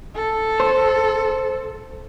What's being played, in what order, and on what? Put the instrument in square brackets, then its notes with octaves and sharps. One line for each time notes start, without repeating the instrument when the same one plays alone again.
[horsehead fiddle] A4
[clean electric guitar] C5